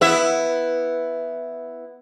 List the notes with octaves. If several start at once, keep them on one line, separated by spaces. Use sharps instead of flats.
B3 E4 E5